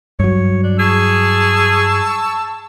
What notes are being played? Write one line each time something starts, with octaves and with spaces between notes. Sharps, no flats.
G2 F#3 C#5
D4
G#4 A5 C#6 E6